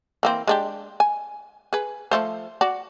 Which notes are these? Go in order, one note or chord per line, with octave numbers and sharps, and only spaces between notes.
E3 A#3 C4
G#3 D4 G4
G#5
G#4 B4
F3 A3 C5
F#4 D5